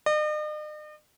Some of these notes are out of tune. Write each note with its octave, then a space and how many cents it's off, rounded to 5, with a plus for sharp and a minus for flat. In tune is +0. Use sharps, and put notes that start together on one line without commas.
D#5 -45